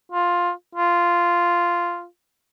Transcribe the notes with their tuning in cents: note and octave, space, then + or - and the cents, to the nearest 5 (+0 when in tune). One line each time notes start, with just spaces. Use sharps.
F4 +10
F4 -5